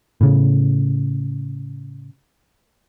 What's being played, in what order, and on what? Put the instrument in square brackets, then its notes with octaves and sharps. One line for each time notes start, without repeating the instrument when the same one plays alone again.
[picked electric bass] A2 C#3